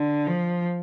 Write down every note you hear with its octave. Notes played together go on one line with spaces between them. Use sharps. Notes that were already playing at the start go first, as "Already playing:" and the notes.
Already playing: D3
F3